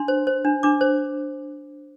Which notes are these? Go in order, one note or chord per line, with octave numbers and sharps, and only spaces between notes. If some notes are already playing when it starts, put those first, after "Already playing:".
Already playing: D4 C6
C5
C5
D4
D4 D6
C5